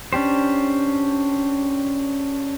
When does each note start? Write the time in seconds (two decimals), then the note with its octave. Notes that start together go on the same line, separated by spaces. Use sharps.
0.13 C#4 D4 G4 C5